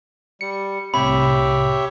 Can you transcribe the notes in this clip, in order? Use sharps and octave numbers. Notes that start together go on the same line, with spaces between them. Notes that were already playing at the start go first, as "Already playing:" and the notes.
G3 C#7
C2 A2 C3 G4 C#5 E5 B5